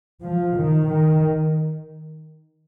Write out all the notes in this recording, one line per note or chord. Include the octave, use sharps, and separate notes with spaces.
F3
D#3
D#3